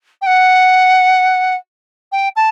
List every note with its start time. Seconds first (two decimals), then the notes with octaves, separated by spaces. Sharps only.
0.22 G5
0.26 F#5
2.12 G5
2.36 A5